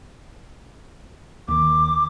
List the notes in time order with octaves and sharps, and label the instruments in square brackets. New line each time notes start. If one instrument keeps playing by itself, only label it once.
[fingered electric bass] D#2 D#3 [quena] D6